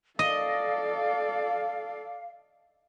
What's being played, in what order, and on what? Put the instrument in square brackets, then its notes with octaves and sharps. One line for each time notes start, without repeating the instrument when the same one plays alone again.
[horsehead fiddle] A4 D5 [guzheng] D#5 [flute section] F5